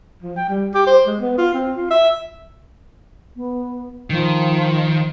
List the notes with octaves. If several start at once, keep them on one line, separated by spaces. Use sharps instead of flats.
F3
G5
G3
G4
C5
G#3
B3
F4
C4
F4
E5
B3
D#3 F3